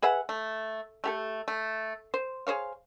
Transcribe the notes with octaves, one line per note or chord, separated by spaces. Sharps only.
G#4 B4 E5 F#5
A3
A3 G4 A4
A3
C5
G#4 C5 C#5 F5